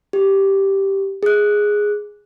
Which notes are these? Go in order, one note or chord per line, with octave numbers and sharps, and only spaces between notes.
G4
G#4 F#6